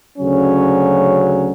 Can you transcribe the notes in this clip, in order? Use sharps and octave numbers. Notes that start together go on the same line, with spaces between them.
D2 C#3 F#3 C#4